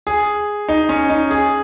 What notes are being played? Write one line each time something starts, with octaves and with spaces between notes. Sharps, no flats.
G#4
D#4
C#4
D#4
G#4